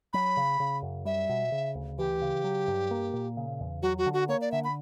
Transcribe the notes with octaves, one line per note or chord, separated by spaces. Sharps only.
F#3 B5
C#3
C#3
F#2
G3 E5
B2
C#3
D2
E3 G4
C#3
F#3
G2
A#3
A#2
C#3
E2
F#3 F#4
F#4
D3
F#4
A#3 C#5
D5
D3 E5
B5